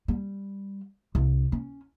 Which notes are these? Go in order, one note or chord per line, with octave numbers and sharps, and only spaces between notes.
G3
C2
C#4